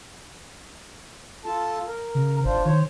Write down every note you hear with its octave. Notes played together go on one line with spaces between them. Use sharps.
F4 A4 A5
A#4
C#3
G#1 D4 F4 C5
D#3 C5 C#5